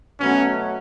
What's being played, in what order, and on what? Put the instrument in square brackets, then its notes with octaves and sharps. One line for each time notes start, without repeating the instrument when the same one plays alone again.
[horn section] B2 F#3 A3 B3 C#4